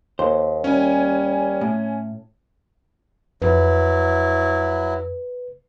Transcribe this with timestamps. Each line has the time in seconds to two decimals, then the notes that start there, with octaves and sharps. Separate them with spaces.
0.19 D#2 C5
0.64 G3 C#4 G#5
1.61 A2
3.42 F2 F#3 E4 B4